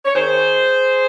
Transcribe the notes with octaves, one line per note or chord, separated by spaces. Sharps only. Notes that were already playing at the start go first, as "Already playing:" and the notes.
C#5
D#3 G#4 C5